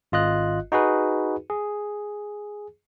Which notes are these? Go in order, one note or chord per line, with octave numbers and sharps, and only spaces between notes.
G#1 F4 D#5 F#6
D#4 F#4 G#4 B4
G#4